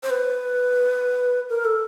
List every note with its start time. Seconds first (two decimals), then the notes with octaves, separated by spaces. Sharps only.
0.03 C5
0.10 B4
1.50 A#4
1.65 A4